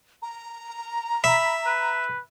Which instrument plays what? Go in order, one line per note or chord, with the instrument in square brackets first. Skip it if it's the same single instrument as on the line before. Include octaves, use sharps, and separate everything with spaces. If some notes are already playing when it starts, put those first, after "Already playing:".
[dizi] A#5
[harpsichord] E5 [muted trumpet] B5
[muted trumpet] B4